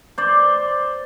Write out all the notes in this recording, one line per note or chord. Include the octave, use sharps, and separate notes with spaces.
C5 D5